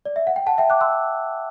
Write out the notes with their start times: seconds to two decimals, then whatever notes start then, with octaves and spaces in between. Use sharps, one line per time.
0.05 D5
0.16 E5
0.27 F#5
0.36 G5
0.47 F#5 A5
0.58 E5 G5
0.70 D6 F#6
0.81 C6 E6